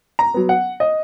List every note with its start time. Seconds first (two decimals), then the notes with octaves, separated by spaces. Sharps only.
0.19 A#5
0.34 F#3 B3
0.49 F#5
0.80 D#5